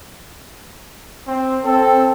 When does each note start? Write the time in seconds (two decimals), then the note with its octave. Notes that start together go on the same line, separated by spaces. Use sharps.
1.27 C4
1.64 C4 A4